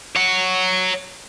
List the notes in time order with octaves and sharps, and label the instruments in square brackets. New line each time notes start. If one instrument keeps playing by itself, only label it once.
[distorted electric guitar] C#5 F#5